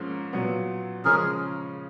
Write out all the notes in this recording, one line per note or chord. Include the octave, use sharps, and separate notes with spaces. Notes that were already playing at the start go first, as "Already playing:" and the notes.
Already playing: G#2 F3 A#3 C#4
A#2 F#3 B3
C#3 F3 G#3 C#4 G#4 A#4